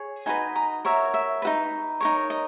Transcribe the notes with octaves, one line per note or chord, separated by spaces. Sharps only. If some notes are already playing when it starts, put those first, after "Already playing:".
Already playing: G#4 C#5
D#4 F#4 B4 D#5 G#5
A#5
F#4 A#4 C#5 E5
E5
D#4 F#4 B4
D#4 A#4 C#5
D#5